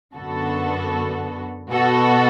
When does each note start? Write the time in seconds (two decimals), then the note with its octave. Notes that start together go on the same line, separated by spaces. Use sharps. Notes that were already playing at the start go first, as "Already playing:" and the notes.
0.14 F#2 D3 B3 F#4 A4
1.71 B2 B3 F#4 A4